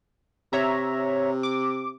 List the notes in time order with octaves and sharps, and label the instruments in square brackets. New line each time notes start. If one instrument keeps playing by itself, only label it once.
[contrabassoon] C3 [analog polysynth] C#5 E5 A#5
[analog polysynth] D6